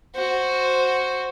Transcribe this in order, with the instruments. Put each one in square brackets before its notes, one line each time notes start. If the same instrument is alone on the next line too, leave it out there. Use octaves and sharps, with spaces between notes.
[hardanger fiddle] F#4 C5